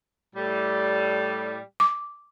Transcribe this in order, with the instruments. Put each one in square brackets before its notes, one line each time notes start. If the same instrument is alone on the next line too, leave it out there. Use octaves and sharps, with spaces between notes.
[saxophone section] A2 G3
[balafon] D6